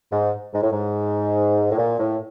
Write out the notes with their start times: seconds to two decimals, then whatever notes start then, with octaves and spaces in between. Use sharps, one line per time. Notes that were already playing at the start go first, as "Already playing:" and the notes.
0.12 G#2
0.54 G#2
0.63 A2
0.71 G#2
1.71 A2
1.77 A#2
1.99 A2